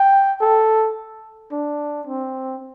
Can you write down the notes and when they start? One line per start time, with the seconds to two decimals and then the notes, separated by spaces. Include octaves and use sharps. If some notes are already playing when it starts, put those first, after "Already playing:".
Already playing: G5
0.41 A4
1.52 D4
2.07 C4